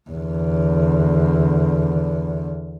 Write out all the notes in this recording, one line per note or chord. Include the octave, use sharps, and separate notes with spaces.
E2 D3